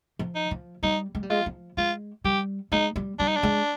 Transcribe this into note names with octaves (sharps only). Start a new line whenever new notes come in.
F3
D#4
F3
G3 D#4
G#3
G3
G#3 F4
F3
G#3 F4
G3 G4
G#3 D#4
G3
G3 D4
D#4
D4
G#3